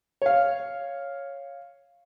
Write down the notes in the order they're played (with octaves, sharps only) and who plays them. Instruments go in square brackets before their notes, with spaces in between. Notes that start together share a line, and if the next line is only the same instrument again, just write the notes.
[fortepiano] C#5 F5